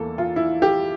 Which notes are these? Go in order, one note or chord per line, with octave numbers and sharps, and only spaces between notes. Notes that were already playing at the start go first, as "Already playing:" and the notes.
Already playing: E2 E3 A#3 A4
F4
E4
G4